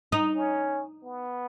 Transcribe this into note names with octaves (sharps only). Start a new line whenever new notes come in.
D#4
C#4
B3